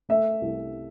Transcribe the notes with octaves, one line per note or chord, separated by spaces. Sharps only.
A3 E5
C2